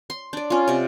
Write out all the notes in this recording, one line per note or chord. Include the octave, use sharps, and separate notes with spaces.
C6
D4 D5
C#4 F4
C3 D5